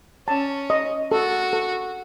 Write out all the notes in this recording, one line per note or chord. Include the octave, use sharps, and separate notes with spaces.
C#4 A5
D#5
F#4 A4
A4